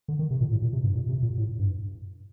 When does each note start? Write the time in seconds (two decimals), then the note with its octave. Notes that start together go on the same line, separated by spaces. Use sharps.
0.08 D3
0.19 D#3
0.31 C3
0.41 A#2
0.52 A2
0.62 A#2
0.73 C3
0.83 G2
0.95 A#2
1.09 C3
1.23 A#2
1.38 A2
1.59 G2